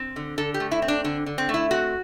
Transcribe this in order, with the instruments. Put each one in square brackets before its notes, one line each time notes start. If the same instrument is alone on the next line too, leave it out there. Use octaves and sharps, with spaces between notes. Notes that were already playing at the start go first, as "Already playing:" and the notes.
Already playing: [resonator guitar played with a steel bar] C4
D3
D3 A4
G4
A3
E4
C4
D4
D3 D4
D3
C4
A3
E4
C4 F#4